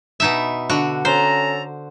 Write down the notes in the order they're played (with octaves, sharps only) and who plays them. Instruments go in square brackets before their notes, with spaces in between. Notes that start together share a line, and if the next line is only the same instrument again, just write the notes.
[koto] B2 D#4 E5
D3 F#4
[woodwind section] C#4 A4 A#5 [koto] C5